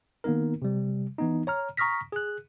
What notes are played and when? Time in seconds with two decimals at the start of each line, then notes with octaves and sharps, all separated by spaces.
0.24 D#3 A#3 B3 D#4 A#4
0.62 C3 G3
1.18 E3 B3 D#4
1.47 C#5 A#5 F6
1.77 A#5 C#6 D#6 F6 A#6 B6
2.12 G#4 F#6